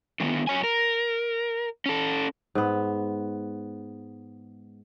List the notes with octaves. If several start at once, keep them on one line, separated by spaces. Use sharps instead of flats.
D3 D#3 G#3 B3
F#2 C#5 G#5
A#4
C#4 A4
G#2 B3